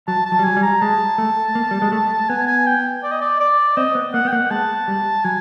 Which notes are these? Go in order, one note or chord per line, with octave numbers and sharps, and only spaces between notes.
F#3 A5
A5
F#3
G3
F#3 G#5
G3
A#5
G#3 A5
A3
A#3
G3
G#3
A3
B3 G#5
G#5
G5
D5
D#5
D5
D5
C4 D#5
B3
A#3 F#5
B3
G5
A#3 F#5
G#3 A5
G3
F#3 G#5